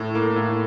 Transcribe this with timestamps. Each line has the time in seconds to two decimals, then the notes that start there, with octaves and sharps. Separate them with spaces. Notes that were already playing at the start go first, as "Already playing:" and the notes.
Already playing: A2
0.15 A#3
0.36 A2